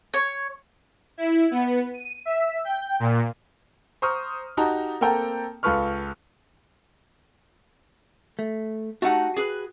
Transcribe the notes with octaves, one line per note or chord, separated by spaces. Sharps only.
C#5
E4
B3
D#7
E5
G5
A#2
C5 A#5 C#6 D#6 F6
D#4 F#4 G4 A5 A#5
A#3 C4 A4 G5 A5 A#5
C#2 F4 A4 B4 C#6 F6
A3
A3 D#4 F#4 G4 F#5
G#4 B4